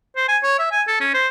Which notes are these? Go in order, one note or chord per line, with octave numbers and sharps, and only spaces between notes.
C5
G#5
C#5
E5
G#5
A4
C#4
C5